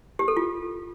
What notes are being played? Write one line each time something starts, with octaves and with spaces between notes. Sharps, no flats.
G4
A4
F4